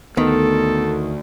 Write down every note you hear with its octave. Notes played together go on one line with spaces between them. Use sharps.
D2 D#3 B3 A4